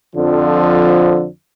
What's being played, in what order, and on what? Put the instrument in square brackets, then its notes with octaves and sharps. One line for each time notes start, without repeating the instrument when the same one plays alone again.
[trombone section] F2 D3 F3